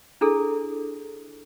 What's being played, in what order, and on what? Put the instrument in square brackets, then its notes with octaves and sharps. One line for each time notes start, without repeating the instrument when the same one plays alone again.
[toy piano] D4 E4 G#4 A4